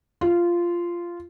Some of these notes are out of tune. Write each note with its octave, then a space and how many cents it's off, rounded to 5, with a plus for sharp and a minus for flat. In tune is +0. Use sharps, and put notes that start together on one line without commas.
F4 -10